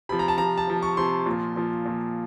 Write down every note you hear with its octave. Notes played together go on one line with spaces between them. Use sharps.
C3 F3 B5
A#5
A5
C3 F3 A#5
A5
C3 F3
C#6
C3 F3 C6
A#2 F3
A#2 F3
A#2 F3